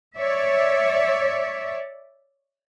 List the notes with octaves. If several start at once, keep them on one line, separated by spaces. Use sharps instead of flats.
C#5 D5 E5